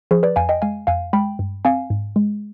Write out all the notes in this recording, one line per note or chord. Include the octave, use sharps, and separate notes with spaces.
F3 G#4 C5
B4 D5
F2 F5 G#5
D#5 G5
G#3 F5 G#5
F2 F5 G#5
G#3 G5 B5
G2
C4 F5 G#5
G#2
G#3